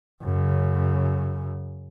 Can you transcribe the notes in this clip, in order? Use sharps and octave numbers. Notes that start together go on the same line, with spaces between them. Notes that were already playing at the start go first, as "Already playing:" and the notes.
F#2 C#3